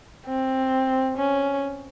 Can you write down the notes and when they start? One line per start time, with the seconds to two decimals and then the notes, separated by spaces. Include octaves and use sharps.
0.26 C4
1.17 C#4